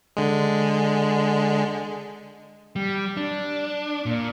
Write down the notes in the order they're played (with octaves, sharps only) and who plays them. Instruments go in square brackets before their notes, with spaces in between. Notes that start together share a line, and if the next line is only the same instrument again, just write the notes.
[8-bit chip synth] D3 G#3
[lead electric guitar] G3
D4
A#2